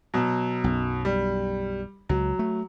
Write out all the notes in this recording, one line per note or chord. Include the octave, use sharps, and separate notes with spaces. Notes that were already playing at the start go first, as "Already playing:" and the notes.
B2 F#3
B1 F#2
G3
C#2 F#3
A3